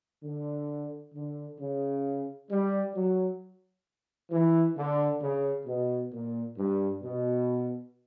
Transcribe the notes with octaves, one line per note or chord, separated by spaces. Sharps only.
D3
D3
C#3
G3
F#3
E3
D3
C#3
B2
A#2
G2
B2